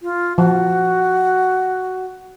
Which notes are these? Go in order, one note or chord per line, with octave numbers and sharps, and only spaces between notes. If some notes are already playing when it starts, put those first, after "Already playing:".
F4
F3 F#4